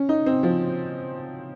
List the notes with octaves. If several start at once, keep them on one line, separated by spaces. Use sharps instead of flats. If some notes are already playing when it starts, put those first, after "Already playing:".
Already playing: C#4
D#4
C4
F3